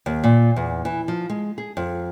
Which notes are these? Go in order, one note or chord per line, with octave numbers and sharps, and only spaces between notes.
D#2
A#2
E2
E3
F3
G#3
G#4
F2